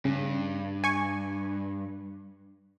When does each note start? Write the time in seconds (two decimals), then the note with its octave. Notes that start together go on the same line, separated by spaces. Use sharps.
0.05 G2 C#3
0.84 G#5 C#6